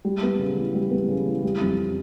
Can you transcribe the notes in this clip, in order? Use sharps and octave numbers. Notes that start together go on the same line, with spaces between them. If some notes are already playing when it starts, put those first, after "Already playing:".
G3
B3
C#3
E3
G3
B3
C#3
E3
G3
F2